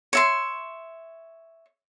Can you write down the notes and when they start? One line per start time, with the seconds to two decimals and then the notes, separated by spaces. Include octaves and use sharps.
0.13 C#5 E5 C6